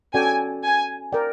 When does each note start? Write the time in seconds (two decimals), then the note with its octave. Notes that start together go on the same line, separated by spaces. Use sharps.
0.14 C#4 F#4 A4 D5 G5 G#5
0.64 G#5
1.12 A#4 D5 G5